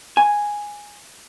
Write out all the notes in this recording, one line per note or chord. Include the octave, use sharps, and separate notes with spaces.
G#5